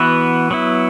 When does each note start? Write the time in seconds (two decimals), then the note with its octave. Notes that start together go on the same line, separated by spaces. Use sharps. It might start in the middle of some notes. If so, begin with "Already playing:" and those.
Already playing: E3 B3 F#4 B4 E5
0.51 F#3 B3 E4